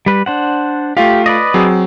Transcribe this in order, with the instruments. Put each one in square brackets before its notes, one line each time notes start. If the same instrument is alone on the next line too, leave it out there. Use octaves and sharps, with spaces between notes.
[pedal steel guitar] G3 B4
D4 C5 F#5
[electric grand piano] A3 F4 F5 [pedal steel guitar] G4
[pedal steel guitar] B4 D5 D#5
[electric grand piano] F#3 C4 G#4